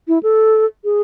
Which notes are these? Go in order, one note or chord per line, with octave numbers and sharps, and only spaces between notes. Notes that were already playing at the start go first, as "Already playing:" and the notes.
E4
A4
G#4